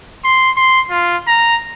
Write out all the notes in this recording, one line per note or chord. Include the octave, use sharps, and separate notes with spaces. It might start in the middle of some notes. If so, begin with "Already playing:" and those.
C6
C6
F4
A#5